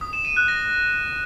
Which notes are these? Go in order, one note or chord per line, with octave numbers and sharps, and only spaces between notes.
D#6
E7
D#7
F#6
A#6